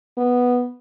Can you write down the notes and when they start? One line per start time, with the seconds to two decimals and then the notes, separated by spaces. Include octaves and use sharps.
0.17 B3